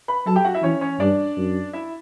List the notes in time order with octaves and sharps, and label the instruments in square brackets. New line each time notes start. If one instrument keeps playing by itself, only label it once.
[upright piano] B4 B5
[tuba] F#3 [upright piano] A4 A5
[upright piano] G4 G5
F#4 F#5
E4 E5
[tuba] E3 [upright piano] C#4 C#5
[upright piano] C#4 C#5
[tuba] G2 [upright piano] D4 D5
[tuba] F#2
[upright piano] E4 E5